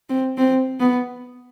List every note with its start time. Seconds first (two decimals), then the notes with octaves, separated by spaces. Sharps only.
0.09 C4
0.38 C4
0.80 B3